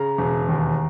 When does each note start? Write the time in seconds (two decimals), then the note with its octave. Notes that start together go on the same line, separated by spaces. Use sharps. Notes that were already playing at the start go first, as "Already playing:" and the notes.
Already playing: C#3 A#5
0.18 E1
0.48 D#2